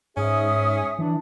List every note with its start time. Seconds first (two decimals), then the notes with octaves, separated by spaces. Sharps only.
0.17 G#2 C#4 G#4 E5 D#6
0.99 E3 D4